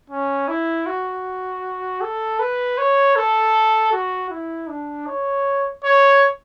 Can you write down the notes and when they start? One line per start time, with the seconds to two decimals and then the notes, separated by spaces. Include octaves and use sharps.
0.10 C#4
0.48 E4
0.86 F#4
2.01 A4
2.40 B4
2.78 C#5
3.16 A4
3.92 F#4
4.30 E4
4.69 D4
5.07 C#5
5.84 C#5